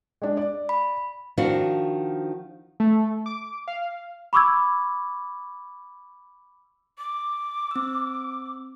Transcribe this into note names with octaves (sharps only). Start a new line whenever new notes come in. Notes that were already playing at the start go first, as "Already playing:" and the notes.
G#3 D4
D5
B5
D#3 F3 D4 F#4
A3
D6
F5
B5 C#6 D6 E6 G#6
D6
C4 E6